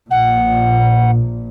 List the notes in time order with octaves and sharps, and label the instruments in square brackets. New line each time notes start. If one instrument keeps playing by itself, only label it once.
[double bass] A#1 A#2 [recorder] F#5